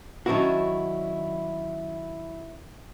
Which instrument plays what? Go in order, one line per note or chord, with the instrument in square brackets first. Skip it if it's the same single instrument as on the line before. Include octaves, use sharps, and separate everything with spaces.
[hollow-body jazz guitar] D#3 F#3 C#4 D4 E4 F#4